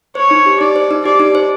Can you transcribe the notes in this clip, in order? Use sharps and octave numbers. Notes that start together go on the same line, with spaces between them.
C5 C#5
D#4
G4
D#4 D5
C5
D#4
G4 D5
D#4
C5